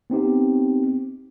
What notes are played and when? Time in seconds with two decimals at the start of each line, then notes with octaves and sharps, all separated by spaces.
0.10 B3 C4 D#4 G4